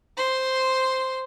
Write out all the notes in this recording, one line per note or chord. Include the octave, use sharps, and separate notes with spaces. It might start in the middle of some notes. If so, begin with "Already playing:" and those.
C5 C6